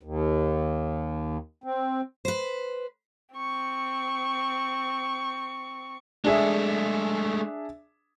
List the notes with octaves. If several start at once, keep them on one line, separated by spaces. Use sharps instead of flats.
D#2
C4
B4 C5
C4 C#6
G#3 A3 D4 G#4 E5